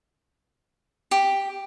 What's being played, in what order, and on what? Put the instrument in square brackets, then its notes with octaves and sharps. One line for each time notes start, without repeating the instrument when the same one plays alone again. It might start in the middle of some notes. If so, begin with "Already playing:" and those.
[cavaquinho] G4